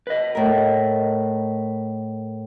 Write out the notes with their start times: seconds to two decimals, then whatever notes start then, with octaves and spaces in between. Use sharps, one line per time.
0.07 B4 D#5
0.35 A2 A#4